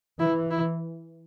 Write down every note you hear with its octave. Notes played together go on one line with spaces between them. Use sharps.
E3 E4
E4